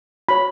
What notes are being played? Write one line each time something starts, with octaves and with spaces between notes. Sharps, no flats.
F#4 C#5 B5